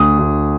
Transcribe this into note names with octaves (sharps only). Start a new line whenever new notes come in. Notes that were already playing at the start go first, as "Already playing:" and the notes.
Already playing: D2 D#6
D2